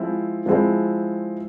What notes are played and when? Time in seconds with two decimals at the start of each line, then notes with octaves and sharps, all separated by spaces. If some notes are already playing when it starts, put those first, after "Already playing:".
Already playing: F3 G#3 C4 E4
0.46 F3 G#3 C4 E4